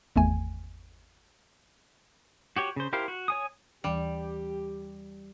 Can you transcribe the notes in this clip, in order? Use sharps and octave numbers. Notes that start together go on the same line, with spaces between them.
G#1 E2 A3 G#5
F#4 G4 C#5
C#3 C5
E4 G4 A#4 C5 F5
F#4
C#5 G#5 D#6
D#2 E3 G3 G4